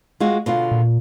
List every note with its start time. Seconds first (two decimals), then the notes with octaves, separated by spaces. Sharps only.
0.20 G#3 F4 F#4
0.46 B2 D3 F4
0.71 A#2